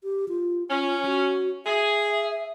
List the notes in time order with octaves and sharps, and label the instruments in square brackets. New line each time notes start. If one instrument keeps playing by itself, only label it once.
[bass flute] G4
F4
[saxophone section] C#4 [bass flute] F4
[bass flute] F#4
[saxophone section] G#4 [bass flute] E5